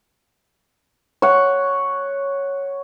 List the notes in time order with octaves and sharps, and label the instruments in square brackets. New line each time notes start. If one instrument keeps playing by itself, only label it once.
[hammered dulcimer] C#5 F#5